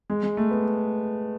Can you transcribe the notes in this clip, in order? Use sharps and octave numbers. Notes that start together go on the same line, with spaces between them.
G#3
G#3
A3
B3